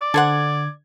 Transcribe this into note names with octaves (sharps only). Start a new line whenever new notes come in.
D5 D6
D3 A4 C5 F#5 G#6